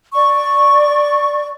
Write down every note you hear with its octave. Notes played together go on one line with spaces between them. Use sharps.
D5 C#6